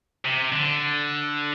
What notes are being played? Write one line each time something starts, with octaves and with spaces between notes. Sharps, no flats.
C3
D3